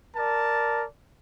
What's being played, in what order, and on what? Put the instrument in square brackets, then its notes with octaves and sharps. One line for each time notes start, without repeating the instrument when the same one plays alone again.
[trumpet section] A#4 D5 A5